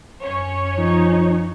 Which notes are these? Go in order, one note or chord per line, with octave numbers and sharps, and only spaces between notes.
F#2 C#4 C#5
F3 D#4